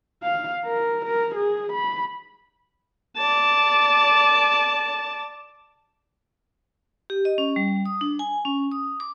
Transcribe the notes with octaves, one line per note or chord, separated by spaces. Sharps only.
F5
A#4
A#4
G#4
B5
D5 A5
G4
D#5
C#4
G3
D#6
D4
G#5
C#4
D#6
D6